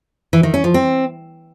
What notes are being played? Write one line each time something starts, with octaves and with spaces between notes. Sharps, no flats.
E3
D#3
C#4
F3
C4